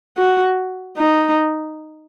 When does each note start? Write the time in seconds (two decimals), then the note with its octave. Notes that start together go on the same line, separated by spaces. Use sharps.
0.17 F#4
0.97 D#4